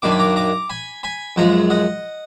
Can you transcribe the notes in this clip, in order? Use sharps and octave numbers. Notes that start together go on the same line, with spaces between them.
F#2 D#3 A#3 D4 D6
B5
A#5 D6
A#5 D6
G#5 B5
G#5 B5
F#2 F3 G#3 F#5 A#5
D#5 F#5